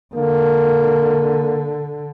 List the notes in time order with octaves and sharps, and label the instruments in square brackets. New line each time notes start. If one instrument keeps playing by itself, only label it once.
[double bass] D3 [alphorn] A#3